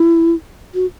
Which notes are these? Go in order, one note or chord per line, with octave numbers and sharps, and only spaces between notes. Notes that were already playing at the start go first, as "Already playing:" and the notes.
Already playing: E4
F#4